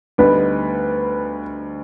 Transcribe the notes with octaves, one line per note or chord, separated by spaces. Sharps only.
D2 D3 G3 B3 D#4 B4